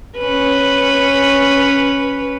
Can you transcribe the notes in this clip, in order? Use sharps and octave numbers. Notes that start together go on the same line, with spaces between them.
C#4 B4